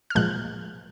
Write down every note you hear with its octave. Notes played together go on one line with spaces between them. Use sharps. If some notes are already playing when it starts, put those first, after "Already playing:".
F6
A#2 F3 G#3 F#6